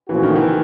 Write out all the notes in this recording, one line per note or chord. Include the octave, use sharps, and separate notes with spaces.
A#2 E3 F3 A3 C#4 F#4
D#3
E3